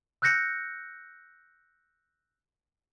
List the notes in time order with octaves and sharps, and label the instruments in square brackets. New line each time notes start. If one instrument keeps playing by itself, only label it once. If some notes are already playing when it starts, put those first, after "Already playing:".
[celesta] E6 F#6 G6 A#6 C#7